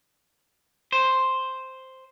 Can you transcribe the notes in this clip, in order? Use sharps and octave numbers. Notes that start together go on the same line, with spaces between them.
C5